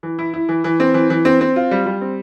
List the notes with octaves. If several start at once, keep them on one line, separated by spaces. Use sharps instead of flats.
E3
E4
E4
E3
E3
C4
E3
E3
C4
C4
F4
G3
G3
C4